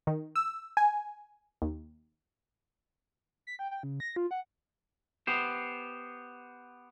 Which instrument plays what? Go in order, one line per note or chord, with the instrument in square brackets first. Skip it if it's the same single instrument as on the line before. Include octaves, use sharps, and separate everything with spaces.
[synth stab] D#3
E6
G#5
D#2
[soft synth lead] B6
G5
G5
C#3
A#6
F4
F#5
[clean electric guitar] B3 G4 C5